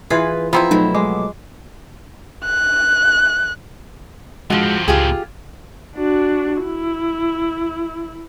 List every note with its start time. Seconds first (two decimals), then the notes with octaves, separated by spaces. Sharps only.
0.10 E3 F4 G#4 B4
0.53 F3 B3 C4 E4 A#5
0.71 B2 F#3 A3 D#4
0.94 G#3 D6
2.45 F#6
4.50 A2 F3 G#3 C4 F#4
4.88 C#2 F4 G4 G#4
5.96 D4 F#4
6.63 E4